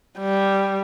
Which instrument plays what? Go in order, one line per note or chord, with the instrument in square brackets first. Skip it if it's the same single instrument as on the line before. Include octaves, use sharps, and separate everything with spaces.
[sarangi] G3